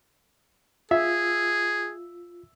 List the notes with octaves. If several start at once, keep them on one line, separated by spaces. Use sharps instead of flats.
F4 G#4 E5